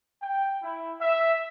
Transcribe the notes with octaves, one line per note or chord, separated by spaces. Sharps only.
G5
E4
E5